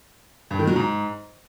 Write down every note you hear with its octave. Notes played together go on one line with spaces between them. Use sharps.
G2
D#3
F#3
G#2